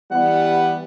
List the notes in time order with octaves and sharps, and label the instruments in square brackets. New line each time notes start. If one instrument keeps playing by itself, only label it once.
[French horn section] E3 G3 B3 [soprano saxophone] F#5